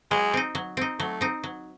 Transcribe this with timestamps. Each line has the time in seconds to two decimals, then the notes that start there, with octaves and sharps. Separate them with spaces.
0.11 F#3 G#3
0.34 C4 D#4
0.55 F#3
0.77 C4 D#4
0.99 F#3 A3
1.21 C4 D#4
1.44 F#3